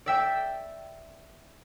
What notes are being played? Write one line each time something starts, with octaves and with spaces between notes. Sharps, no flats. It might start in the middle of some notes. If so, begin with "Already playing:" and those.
D5 E5 G5